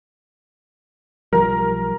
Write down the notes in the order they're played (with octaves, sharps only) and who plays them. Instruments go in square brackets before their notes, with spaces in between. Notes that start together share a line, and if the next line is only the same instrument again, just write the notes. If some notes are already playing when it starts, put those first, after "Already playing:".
[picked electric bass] B1 F3 G3 [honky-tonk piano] A#4